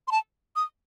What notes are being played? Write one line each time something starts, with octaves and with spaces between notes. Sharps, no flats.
C6
A5
D#6